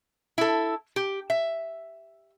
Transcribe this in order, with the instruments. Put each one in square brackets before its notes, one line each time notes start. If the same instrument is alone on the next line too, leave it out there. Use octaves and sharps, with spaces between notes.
[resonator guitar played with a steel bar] E4 A4
G4
E5